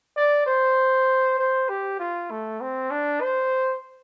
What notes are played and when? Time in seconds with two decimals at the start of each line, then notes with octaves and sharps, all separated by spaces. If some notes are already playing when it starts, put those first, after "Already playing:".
0.17 D5
0.46 C5
1.38 C5
1.69 G4
1.99 F4
2.31 A3
2.61 C4
2.91 D4
3.21 C5